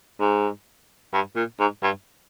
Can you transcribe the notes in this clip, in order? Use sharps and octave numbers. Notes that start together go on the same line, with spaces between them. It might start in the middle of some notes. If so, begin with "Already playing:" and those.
G#2
G2
A#2
G#2
G2